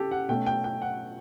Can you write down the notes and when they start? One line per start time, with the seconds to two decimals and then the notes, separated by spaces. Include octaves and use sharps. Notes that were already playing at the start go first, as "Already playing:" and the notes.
Already playing: C#3 G4 A4
0.11 F#5
0.28 B2 A3 C#4 G5
0.46 G5
0.64 G5
0.82 F#5